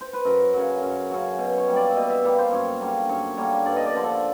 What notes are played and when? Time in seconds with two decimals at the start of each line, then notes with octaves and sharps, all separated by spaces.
0.01 C5
0.13 B4
0.25 F#2 A#4
0.53 C#3 F#3
0.82 F#2
1.11 C#3 F#3
1.39 B2
1.58 C#5
1.67 G3 A#3
1.76 D5
1.90 E5
1.96 B2 D#5
2.10 E5
2.24 G3 A#3 F5
2.38 C5
2.52 F#2 C#5
2.81 D3 G3 A#3
3.09 F#2 C#5
3.37 D3 G3 A#3 C#5
3.66 G2 D5
3.76 D#5
3.85 D5
3.95 D3 F3
4.04 A4